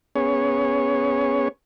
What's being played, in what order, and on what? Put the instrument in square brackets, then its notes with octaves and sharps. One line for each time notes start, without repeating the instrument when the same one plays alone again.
[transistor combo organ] B3 C#4 G#4 C#5